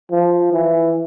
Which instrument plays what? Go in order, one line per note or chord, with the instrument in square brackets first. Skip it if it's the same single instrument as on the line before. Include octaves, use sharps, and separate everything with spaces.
[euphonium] F3
E3